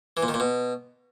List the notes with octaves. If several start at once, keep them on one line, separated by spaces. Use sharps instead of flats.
E3
A#2
D#3
A#2
B2